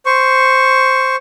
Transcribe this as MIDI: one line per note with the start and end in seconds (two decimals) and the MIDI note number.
0.06 1.16 72
0.06 1.16 85